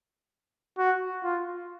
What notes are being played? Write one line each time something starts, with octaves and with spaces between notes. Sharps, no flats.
F#4
F4